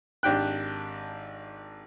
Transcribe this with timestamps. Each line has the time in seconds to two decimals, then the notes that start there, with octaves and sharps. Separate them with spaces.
0.23 G#1 D4 G4 G5 F#6